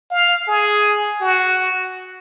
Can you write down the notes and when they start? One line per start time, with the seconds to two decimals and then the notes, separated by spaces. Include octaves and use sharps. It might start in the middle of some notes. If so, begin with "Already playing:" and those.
0.11 F5
0.48 G#4
1.21 F#4